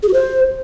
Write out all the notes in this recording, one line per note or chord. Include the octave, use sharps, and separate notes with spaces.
G#4
F#4
C5